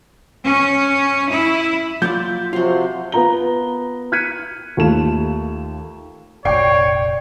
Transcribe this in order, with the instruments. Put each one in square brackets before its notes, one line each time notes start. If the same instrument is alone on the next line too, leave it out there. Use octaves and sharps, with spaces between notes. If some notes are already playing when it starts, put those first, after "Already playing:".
[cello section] C#4
E4
[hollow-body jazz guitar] F#3 A#3 D5 [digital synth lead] F4 [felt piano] G6
[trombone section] C3 F3 F#3 [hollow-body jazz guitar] F4 F#4 [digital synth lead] C6
[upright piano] B3 F4 A#5 G7
F6 F#6 G#6 B6 C#7 D#7
D#2 A3 F4 A4 A5 E7
[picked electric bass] F1 A#1 [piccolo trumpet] C#5 [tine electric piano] D5 [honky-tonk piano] G5 C7